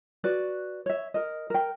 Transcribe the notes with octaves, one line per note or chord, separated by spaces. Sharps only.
F#4 B4 D5
C#5 E5
A#4 D#5
A#4 G5